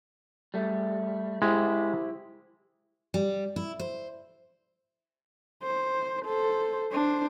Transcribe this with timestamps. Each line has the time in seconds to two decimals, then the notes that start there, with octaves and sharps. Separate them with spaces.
0.54 G3 A3
1.42 G#3 E4 G4 C5
3.14 G3
3.56 E4
3.79 C5
5.63 C5
6.25 A4 C5
6.92 D4 C5